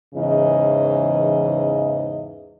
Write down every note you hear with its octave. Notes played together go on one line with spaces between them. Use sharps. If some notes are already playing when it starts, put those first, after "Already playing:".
E2 G#2 C#3 E3 D#5